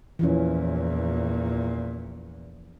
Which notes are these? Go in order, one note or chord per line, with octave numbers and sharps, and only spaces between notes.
E2 A#2 E3 F3 C#4